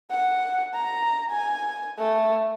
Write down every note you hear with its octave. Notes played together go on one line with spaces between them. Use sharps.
F#5
A#5
G#5
A3